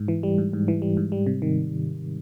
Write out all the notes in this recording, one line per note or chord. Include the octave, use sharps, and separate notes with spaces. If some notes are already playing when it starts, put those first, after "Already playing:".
Already playing: G#2
E3
G3
G#2
G#2
E3
G3
G#2
G3
C3
D#3